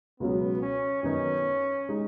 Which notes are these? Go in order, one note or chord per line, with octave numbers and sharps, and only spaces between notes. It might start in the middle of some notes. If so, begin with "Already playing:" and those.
C#2 B2 F#3 B3 C#4
C#4
F#2 D#3 B3 C#4 D#4
G#3 D#4